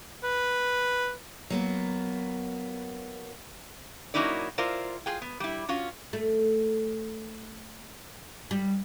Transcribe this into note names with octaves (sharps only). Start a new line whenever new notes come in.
B4
F#3 A#3 B3
F#3 A#3 C#4 D#4 E4 D5
E4 F4 A#4 C5 D5
F4 G#4 G5
B3
G3 E4
C#4 F4 F#4
A3
G3